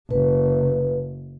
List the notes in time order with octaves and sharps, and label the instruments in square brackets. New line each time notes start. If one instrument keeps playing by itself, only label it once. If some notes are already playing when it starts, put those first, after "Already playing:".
[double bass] F#1 [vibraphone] B4